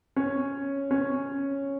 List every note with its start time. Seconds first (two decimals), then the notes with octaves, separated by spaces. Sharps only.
0.16 C#4
0.91 C#4